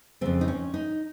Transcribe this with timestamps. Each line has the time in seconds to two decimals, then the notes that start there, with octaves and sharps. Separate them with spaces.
0.21 F2 C#3 C4
0.41 D#4
0.48 C#4
0.74 D#4